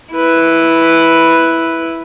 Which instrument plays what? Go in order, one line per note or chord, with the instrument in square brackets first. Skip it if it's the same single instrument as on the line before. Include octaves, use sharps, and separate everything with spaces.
[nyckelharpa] E4 B4